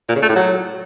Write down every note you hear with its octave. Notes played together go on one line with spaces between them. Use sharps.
A#2
C#3
A3
A2
F#3